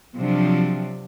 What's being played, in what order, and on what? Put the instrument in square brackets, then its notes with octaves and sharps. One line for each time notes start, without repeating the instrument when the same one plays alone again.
[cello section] C3 F3 F#3 D4